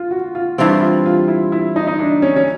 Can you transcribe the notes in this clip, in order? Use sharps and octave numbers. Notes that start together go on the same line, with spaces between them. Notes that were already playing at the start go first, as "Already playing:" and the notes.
Already playing: F4
F#4
F4
G2 E3 G3 C4 E4
F4
F4
E4
E4
D#4
D#4
D4
C#4
C#4